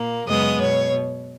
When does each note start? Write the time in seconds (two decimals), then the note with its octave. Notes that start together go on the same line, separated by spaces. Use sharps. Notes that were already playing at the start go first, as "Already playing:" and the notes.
Already playing: A#2 A#3
0.26 F#2 C#3 G#3 B3 D#5
0.60 B2 C#5